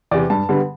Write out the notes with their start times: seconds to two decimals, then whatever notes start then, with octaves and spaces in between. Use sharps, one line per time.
0.11 E2 D5
0.14 C3
0.30 G2 A5
0.49 D3 G3 B3